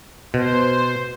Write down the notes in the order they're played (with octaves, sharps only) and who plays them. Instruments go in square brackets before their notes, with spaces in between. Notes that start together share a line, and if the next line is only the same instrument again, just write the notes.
[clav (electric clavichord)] B2 [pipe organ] C5